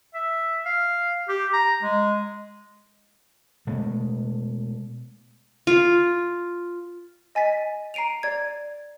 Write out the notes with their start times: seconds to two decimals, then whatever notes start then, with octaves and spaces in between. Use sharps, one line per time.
0.15 E5
0.66 F5
1.29 G4
1.53 A#5
1.83 G#3
3.67 B2 G#3 A3
5.67 F4
7.35 D#5 G#5 A6 B6
7.94 A#5 C7 D7 D#7 F7
8.23 D5 G#6